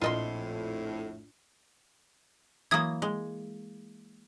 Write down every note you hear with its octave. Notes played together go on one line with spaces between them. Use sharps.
A#1 F2 A2 F4 D#5 C6
E3 F#3 A#3 D#6 G#6
G#3